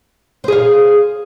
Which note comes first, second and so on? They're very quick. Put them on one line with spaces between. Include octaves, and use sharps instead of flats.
C5 G#4 F5